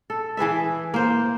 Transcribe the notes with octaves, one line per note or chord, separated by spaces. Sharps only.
A4
E3 G#4 B4 E5
A#3 C5